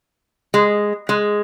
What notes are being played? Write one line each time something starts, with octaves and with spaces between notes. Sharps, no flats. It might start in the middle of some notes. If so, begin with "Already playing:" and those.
G#3
G#3